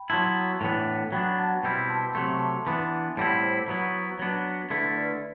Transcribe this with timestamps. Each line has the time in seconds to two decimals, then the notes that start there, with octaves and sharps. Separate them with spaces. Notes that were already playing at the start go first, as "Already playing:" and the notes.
Already playing: G5 B5
0.10 F#3 B3 E4 A5 C6
0.61 A2 E3 B3 D4
1.12 F#3 B3 D4 G5 B5
1.26 B5
1.38 F#5 A5
1.63 B2 G3 C4 E4 G5 B5
1.90 A5 C6
2.15 C3 F#3 A3 C6
2.27 D6
2.39 A5 C6
2.67 E3 B3 D4
3.17 A2 G3 C4 E4 F#5 A5
3.43 C5
3.68 F#3 B3 E4 B4
4.19 F#3 B3 D4
4.70 D3 A3 E4 B4
4.97 B4 D5